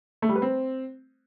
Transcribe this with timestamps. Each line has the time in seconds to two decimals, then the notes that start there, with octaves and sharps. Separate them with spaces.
0.22 A3
0.29 G3
0.36 B4
0.42 C4